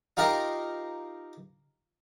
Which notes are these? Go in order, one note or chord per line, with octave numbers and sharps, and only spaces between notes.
D#4 F4 G4 A#4